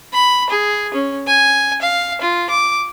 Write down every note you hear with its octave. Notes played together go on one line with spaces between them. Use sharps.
B5
G#4
C#4
G#5
F5
F4
D6